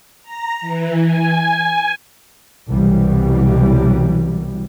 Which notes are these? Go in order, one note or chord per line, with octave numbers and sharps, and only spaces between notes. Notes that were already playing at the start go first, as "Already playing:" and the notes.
A#5
E3
G#5
C2 B2 E3 F#3 G3